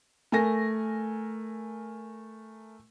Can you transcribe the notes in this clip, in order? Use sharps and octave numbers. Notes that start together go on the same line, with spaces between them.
A3 A#4 G#5 A#6